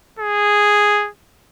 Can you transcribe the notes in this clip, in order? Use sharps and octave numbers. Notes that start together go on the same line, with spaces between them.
G#4